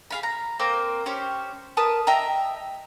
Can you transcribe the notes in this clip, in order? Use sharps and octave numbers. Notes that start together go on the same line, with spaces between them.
G#4 F5 B5
A#5
A#3 C4 C5 A#5
C#4 G4 C5 C#5
A#4 B4 A5 D#6
D#5 E5 G5 A#5